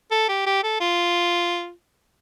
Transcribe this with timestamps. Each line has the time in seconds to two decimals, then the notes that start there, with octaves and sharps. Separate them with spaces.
0.11 A4
0.29 G4
0.47 G4
0.64 A4
0.80 F4